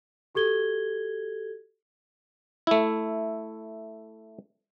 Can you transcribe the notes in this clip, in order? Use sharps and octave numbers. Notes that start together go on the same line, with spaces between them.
F#4 G4 A4 G#6 G7
A3 E4